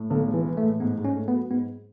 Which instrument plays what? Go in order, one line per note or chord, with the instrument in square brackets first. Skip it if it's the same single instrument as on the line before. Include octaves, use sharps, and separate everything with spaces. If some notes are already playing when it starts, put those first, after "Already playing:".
Already playing: [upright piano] A2
[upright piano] B1 [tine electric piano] D3
[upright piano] G#3
[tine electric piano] E3
[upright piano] E3
[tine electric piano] A3
[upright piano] A2
[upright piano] G#2 [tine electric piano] B3
[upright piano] G#2
[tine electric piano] C#4
[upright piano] A3
[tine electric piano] B3
[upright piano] F#3
[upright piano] G#2 [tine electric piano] B3